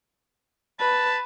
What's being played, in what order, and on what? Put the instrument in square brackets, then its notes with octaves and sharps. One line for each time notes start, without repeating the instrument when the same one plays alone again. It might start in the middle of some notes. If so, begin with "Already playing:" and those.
[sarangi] B4 [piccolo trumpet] A5